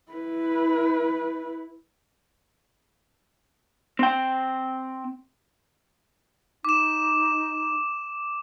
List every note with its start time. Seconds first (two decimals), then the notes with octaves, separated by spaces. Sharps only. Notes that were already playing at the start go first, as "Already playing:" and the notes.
0.12 E4 B4
3.99 C4 G5
6.65 D#4 D6 E7